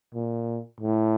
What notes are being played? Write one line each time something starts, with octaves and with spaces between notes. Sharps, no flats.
A#2
A2